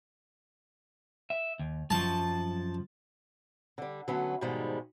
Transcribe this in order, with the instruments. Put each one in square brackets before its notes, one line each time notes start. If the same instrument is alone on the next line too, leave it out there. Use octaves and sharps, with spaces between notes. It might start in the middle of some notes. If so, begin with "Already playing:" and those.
[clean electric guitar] E5
D#2
[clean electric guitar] F#2 F3 F#3 [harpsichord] A5
[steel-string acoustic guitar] D3 G3
D3 F#3 A3 B3 C#4
G#2 B2 D#3 F3 G3 G#3